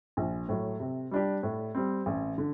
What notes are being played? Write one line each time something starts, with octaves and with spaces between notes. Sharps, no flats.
A#1
A2 F#3
C3
G3 D4 G4
A2
G3 C4
A1
D3